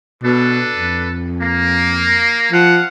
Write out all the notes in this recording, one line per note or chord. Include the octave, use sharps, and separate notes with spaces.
B2 D4 A4 B4
F2
A#3
F3 F5 F#5